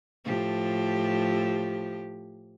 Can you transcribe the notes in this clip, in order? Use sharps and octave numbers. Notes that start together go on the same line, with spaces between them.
A2 F3 G4